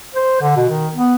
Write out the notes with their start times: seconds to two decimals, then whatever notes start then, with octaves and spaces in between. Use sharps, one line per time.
0.15 C5
0.41 D3
0.56 B2
0.69 D#3
0.95 B3